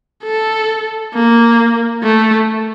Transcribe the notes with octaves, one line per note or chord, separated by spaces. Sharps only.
A4
A#3
A3